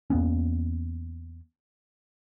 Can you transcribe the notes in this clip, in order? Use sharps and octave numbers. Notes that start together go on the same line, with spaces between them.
E2 A#3 B3 C#4